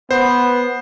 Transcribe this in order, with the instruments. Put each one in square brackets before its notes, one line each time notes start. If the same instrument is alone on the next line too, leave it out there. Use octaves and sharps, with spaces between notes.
[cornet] B3 [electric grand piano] C5